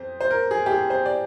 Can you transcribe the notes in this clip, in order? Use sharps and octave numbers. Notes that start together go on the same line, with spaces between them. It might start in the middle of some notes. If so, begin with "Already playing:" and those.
Already playing: F2 C5
C5
A#4
G#4
G4
G#4
C5
D5